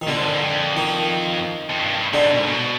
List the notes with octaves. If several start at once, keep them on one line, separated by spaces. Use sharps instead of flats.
D#3
B2 D3
G#2
G2
G#2
F2
D#3
F2
G2
G#2 D3
B2
G#2
B2